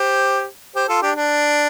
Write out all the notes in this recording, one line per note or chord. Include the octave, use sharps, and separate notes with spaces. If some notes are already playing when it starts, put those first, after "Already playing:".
Already playing: G4 C5
G4 C5
F4 A4
D4 G4
D4